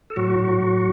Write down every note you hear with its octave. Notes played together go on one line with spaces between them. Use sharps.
A4
A2 F#3 F#4
A2
A2